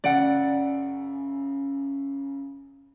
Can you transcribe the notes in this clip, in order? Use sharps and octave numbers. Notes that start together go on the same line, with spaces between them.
F#2 C#3 D5 F#5 D7